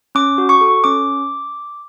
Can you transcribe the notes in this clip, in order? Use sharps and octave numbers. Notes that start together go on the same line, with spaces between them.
C#4 D6
F#4
C#6
A4
C#4 D6